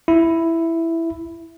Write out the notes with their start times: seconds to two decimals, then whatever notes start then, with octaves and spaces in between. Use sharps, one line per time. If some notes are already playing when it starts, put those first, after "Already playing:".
0.08 E4